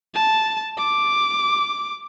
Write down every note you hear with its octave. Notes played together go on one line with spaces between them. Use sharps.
A5
D6